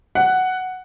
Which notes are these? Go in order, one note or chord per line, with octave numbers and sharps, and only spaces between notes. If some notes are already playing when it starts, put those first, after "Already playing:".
F#5